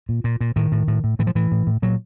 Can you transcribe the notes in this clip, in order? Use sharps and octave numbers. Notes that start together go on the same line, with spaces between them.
A#2
A#2
A#2
A2 D#3
A2
A2
A2
A2 E3
F3
A2 E3
A2
A2
A#2 F#3